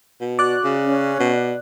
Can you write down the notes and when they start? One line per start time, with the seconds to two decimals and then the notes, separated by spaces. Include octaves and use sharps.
0.21 B2
0.39 F#4 D5 F#6
0.64 C#3
0.85 C#4
1.20 B2